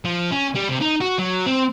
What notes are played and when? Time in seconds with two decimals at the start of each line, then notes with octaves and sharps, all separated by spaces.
0.05 F3
0.32 C#4
0.55 G3
0.70 C3
0.82 D#4
1.01 F#4
1.19 F#3
1.46 C4